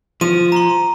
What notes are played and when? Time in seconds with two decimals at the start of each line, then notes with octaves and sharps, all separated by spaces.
0.21 F3 D#7
0.52 A#5 C6